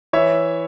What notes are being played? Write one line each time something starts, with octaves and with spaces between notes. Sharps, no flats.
E3 C#5 E5